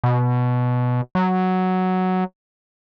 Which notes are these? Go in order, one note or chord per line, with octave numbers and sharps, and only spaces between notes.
B2
F#3